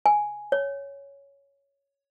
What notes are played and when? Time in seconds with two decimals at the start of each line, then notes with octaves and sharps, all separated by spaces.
0.06 G#5
0.52 C#5